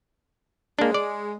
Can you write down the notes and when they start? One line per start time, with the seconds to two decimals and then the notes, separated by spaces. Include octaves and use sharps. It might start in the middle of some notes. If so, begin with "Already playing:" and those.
0.79 G#3 A#3 D4
0.94 D5